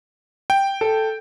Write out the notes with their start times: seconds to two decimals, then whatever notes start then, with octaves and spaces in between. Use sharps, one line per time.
0.50 G5
0.81 A4